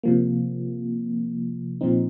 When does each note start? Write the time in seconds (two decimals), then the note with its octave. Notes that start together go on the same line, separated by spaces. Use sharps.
0.03 C3 F3 A#3
1.81 A#2 F3 C4 D#4